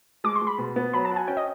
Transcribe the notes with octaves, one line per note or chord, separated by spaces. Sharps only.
G#3 D6
C6
G#3
B5
B2
B3
F#3 B5
A5
F#4 G#5
C#4 G5
D#5